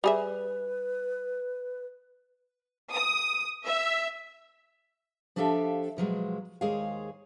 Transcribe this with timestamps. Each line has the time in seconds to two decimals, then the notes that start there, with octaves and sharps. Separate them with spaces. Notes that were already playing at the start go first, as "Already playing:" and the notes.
0.04 G3 G#4 B4 E5
2.92 D#6
3.65 E5
5.36 F3 D4 G4 A4 E5 F5
5.97 B2 F3 F#3 G#3
6.61 D#2 G#3 G#4 C5 C#5 F5